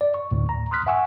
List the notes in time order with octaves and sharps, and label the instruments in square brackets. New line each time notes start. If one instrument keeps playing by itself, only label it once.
[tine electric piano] D5
C#6
D2 A2
A#5
C6 D#6 F6 F#6 B6
E5 F#5 G#5 C#6 E6